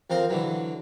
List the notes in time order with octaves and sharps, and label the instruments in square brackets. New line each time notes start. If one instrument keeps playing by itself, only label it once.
[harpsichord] F2 C4 A#4 F5
D3 E3 F#3